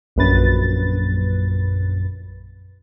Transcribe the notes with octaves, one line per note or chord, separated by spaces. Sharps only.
A#1 F#2 B4 A6